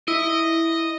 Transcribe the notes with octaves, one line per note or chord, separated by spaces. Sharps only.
E4 D#5